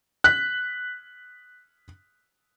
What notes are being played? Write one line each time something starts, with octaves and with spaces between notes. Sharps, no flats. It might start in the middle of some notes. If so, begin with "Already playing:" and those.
F#6 B6